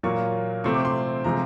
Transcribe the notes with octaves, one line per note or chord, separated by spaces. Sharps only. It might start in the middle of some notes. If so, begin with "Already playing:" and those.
A#2 F#3 A#3 C#6
C3 F3 A3 C4 C#6
D6
C6
C3 F3 G#3 C4 A#5